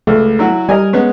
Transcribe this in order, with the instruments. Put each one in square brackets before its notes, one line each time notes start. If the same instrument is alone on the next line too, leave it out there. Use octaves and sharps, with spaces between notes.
[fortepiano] C#2 [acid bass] A3
[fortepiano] F#3 E4 F#4
[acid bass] G3 [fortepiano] A#4 D#5 G#5
[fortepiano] G#3 B3 C#4